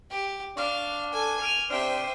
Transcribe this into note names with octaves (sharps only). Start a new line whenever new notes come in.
G4
D4 F5 C#6 D6 F6
A4 G#5
F6 D7 D#7 F7
C3 D4 C5 E5 G5 F6